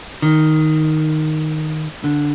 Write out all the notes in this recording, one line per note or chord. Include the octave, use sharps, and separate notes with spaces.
D#3
D3